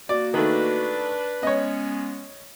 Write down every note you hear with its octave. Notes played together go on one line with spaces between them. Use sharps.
A#3 F#4 D5
D#3 A3 D4 B4
G#3 B3 C#4 C#5 D#5